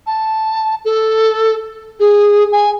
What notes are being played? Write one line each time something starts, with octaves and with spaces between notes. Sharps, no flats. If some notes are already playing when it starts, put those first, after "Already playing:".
A5
A4
G#4
G#5